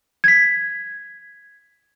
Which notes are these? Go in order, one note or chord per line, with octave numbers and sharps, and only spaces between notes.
G#6 B6